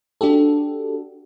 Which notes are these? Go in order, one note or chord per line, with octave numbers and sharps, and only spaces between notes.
D4 F#4 G4 A4